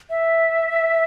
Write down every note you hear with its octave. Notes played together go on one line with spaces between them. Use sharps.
E5